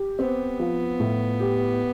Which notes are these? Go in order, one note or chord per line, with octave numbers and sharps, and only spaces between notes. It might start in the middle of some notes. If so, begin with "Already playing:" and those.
Already playing: G4
B3 C4
F3
A2
G4